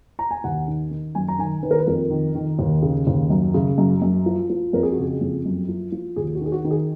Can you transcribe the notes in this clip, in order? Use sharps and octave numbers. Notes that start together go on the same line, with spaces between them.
A#5
G#5
D#2 F#5
D#3
D#3
F#2 G#5
A#5
D#3 G#5
D#3 B4
A#4
B4
F2 A#4
D#3
D#3
D#2
C#3
D#2
F#2
C#3
F#2
F#2
F3
F3
F2 A#4
G#4
F#4
C#3 G#4
F2
F#2
F3
F3
D#2 G#4
F#4
D#3 G#4
F#4
D#3
G#4